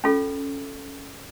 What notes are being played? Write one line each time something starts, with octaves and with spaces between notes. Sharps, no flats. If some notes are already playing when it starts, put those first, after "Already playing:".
C#4 F4 A4